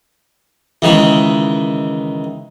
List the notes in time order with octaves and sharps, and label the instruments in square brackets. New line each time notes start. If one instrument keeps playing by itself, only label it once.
[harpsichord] C#2 D#3 E3